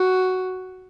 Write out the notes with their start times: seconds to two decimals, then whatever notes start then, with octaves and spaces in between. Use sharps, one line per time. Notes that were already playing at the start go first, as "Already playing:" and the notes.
Already playing: F#4